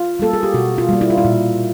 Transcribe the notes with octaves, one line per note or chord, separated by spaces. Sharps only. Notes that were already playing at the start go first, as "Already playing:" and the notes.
Already playing: F4
G3 A#3 A4
G#4
G4
B2 F#4
F4
G3 A#3
E4
F4
E4
A#2